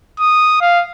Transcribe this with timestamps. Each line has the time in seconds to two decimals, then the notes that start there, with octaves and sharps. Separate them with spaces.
0.19 D#6
0.61 F5